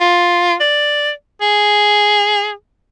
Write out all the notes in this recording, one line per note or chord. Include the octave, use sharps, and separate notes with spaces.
F4
D5
G#4